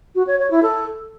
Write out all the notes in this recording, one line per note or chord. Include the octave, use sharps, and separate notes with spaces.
F#4
C#5
C#5
E4
A4